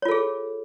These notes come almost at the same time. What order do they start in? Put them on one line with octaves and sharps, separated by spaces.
C#5 F4 A4 G#4